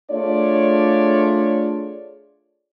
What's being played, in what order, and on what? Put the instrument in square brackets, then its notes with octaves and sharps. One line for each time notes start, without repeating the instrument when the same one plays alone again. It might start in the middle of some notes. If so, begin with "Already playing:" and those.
[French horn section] A3 D4 F4 G#4 C#5 D5